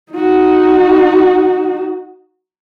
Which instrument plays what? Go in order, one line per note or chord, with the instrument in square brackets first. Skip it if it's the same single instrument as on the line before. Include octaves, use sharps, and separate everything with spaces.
[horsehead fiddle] D#4 F#4